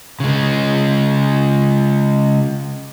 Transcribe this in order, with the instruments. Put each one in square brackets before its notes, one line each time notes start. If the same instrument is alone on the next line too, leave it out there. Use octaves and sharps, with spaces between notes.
[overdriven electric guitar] C#3 G#3